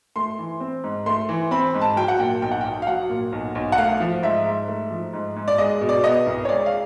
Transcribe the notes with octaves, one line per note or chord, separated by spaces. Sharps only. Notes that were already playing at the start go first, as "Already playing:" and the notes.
A3 C6
E3
C4
G#2
A3 C6
E3
C4 B5
G#2
A5
F#3 G5
F#5
A#2 G5
B1 G5
F#5
B1 G5
F5
F#3 F#5
A#2
B1
B1
F#5
A3 F5
F3
G#2 E5
G#2
A3
F3
G#2
G#2
D5
G#3 D#5
B2
D5
B3 D#5
C2
C#5
G#3 D5
F5